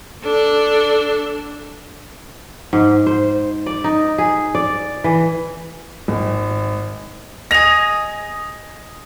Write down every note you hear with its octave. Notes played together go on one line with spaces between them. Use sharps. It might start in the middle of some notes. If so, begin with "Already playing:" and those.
D4 A4
G#2
C5
D5
D#4
G#4
D5
E3
G#1
G#4 D#5 A#6 F7